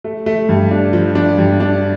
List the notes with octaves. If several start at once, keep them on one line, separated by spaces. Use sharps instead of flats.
A3
A3
G2
D4
F3
D4
G2
D4